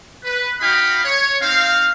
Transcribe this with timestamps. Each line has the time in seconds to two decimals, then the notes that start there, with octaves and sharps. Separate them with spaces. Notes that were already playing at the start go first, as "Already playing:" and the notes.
0.24 B4
0.60 D#4 F#4 D#5 F5 G5 B5
1.04 C#5
1.41 C4 D#4 C5 F5